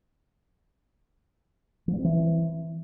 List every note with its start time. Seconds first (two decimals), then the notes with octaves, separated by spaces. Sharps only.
1.88 F3
1.93 G3
1.99 C4
2.04 E3